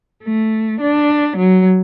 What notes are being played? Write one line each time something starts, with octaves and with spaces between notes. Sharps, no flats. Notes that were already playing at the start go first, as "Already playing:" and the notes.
A3
D4
F#3